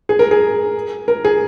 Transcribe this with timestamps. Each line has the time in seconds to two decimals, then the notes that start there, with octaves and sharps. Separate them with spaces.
0.09 G#4
0.19 A#4
0.31 G#4
1.08 A#4
1.25 G#4